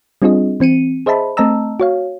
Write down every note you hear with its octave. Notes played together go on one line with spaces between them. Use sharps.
G3 C4 D4 F4 G#4 D#5
E3 C4 C#7 D#7
G#4 C5 D#5 E5 A5 B5
A3 C4 D#5 A5 A#5 E6
F#4 C#5 F5